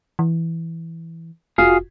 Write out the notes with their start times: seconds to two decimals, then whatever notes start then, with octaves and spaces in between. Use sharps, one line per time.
0.19 E3
1.58 F1 F4 F#4 G#4 F5